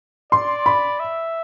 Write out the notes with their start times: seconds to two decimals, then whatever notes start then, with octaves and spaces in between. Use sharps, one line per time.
0.32 D5 C6
0.66 B5
1.00 E5